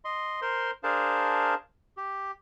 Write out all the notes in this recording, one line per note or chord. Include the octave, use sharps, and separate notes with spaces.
D#5 C6
A#4 C5 C6
D4 G#4 A#4 C5 F5 A5
G4